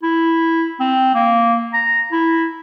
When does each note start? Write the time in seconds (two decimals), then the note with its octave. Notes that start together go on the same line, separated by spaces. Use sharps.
0.03 E4
0.80 C4
1.15 A#3
1.73 A#5
2.12 E4